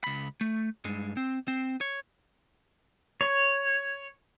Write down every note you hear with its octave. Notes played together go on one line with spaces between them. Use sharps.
C#2 B5
A3
G2 G#3
C4
C4
C#5
C#5